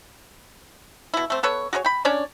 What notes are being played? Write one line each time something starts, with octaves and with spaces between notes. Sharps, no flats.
B2 E4
A3 C4
B3 A4 B4 C#5
F#4 G#4 A#4 C#5
G5 B5
C#4 D4 C#5 D5